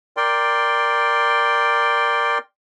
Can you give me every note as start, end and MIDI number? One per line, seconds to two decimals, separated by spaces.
0.17 2.38 70
0.17 2.38 74
0.17 2.38 79
0.17 2.38 84